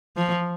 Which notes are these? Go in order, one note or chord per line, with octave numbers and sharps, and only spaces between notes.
F3